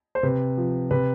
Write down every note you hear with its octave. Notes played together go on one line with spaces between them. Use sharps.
C5
C3 B4
F3
C3 B4